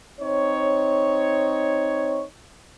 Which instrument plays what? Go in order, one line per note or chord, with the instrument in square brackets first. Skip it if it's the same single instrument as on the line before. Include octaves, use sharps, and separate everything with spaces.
[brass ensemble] C4 D#4 C#5